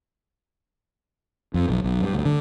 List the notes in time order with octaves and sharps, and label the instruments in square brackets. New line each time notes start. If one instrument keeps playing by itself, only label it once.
[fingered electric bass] F2
B1
B1
G2
D2
D3